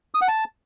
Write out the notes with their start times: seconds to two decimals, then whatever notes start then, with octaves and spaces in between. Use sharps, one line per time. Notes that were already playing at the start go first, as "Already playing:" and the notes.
0.15 D#6
0.21 F#5
0.28 A5